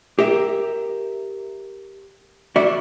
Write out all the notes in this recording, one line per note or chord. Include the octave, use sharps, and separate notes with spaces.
G4 A#4 E5
F#4 D5 E5